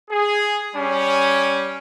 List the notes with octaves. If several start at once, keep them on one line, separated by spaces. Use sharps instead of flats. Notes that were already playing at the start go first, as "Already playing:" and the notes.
G#4
G3 C#4